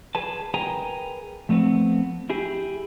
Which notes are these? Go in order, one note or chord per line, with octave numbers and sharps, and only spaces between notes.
G#4 B4 A5
G#4 A#4 B4 G5 G#5 A#5
F3 A3 B3 C4
E4 G4 G#4